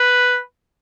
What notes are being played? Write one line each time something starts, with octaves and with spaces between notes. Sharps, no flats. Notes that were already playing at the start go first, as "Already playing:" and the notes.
Already playing: B4